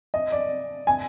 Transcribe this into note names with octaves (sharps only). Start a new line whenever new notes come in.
D#5
D5
G#5